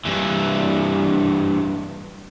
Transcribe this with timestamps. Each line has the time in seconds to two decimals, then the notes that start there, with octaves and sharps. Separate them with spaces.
0.05 G2 E3